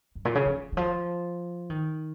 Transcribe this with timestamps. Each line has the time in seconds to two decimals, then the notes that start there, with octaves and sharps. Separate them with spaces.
0.15 F#2
0.25 A#2
0.35 C#3
0.46 F3
0.72 D#3
0.77 F3
1.70 D#3